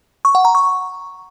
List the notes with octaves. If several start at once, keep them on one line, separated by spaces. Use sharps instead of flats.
C#6
F#5
A#5
C#6